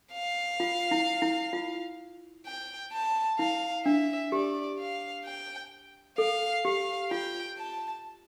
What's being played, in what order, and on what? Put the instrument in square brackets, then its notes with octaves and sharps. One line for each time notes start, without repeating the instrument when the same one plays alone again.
[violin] F5
[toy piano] F4
E4
E4
F4
[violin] G5
A5
[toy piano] E4 [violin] F5
[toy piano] D4 [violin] E5
[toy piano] G4 [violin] D5
[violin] F5
G5
[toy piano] A4 [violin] F5
[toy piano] G4 [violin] F5
[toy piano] F4 [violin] G5
[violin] A5